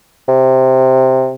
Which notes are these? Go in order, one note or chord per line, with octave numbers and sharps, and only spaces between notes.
C3